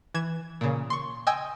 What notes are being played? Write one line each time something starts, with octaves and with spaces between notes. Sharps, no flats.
E3 G#6 E7
A#2 C#3
C6 C#6
D#5 G5 G#5 E6